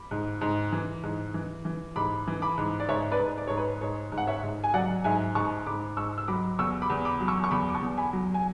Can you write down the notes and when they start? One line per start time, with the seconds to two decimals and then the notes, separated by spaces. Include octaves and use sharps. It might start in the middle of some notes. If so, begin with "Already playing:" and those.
Already playing: B5 D6
0.11 G#2
0.41 G#2
0.72 E3
1.03 G#2
1.34 E3
1.65 E3
1.96 G#2 B5 D6
2.27 E3
2.42 B5 D6
2.58 G#2
2.80 D5
2.89 G#2 C#5 E5
3.12 B4 D5
3.19 G#2
3.38 D5
3.47 G#2 C#5
3.58 B4
3.81 G#2 C#5
4.12 G#2
4.18 F#5
4.27 C#5 E5
4.43 G#2
4.64 G#5
4.74 F#3 D5 F#5
5.04 G#2 E5 G#5
5.35 G#2 A5 C#6
5.66 G#2 B5 D6
5.97 G#2 C#6 E6
6.18 E6
6.28 F#3 B5 D6
6.59 E2 C#6 E6
6.82 B5 D6
6.90 E2
7.05 B5 D6
7.21 F#3
7.28 C#6 E6
7.44 C#6
7.51 E2 B5 D6
7.69 D6
7.74 A5 C#6
7.82 E2
7.97 G#5 B5
8.13 F#3
8.34 G#5